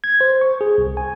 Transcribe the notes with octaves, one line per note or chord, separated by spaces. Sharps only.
G#6
C5
C#6
G#4
C2
G#5